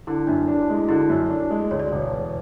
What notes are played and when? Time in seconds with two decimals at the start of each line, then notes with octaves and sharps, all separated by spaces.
0.07 D3 E4
0.27 F#2 D4
0.48 D4 E4
0.61 F#4
0.69 G#3 E4
0.85 F#4
0.89 D3 E4
1.09 F#2
1.30 D4
1.51 G#3
1.71 D2 C#5
1.80 D5
1.88 E1 C#5
2.12 E1